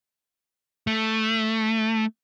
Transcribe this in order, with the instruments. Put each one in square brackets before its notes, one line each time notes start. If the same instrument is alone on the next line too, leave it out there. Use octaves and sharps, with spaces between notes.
[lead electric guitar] A3